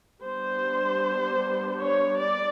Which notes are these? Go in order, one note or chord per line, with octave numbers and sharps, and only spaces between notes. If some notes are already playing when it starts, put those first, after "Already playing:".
G3 B3 D4 C5
C#5
D5